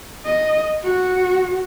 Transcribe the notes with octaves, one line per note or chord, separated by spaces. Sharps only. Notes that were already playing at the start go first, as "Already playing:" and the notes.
D#5
F#4